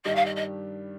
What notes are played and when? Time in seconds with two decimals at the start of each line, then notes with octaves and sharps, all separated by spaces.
0.05 G2 D#3 G3 D4 G4 D#5
0.15 F5
0.25 D#5
0.36 D#5